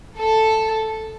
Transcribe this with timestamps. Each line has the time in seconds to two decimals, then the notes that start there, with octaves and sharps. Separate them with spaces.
0.19 A4